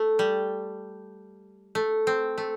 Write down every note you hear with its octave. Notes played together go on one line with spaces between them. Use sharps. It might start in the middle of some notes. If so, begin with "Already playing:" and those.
Already playing: A3
G3
A3
C4
A3